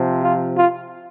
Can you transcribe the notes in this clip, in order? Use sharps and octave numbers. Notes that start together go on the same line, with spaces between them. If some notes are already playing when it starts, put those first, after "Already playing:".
Already playing: C3 F3
F4
F4